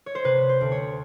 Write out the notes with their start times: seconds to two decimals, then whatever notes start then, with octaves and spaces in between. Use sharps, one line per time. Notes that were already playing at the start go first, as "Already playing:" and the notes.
0.06 C#5
0.15 C5
0.24 C3 B4
0.49 C5
0.61 D2
0.72 C#5